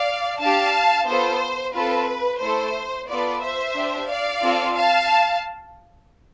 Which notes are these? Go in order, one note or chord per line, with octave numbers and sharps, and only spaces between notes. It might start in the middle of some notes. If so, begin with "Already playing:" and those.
Already playing: D5 F5
D4 G4 F5 A5
B3 F4 A4 C5
C4 F4 A4 B4
A3 E4 A4 C5
B3 F4 A4 B4 D5
C5 E5
D4 G4
D5 F5
C4 F4 A4
F5 A5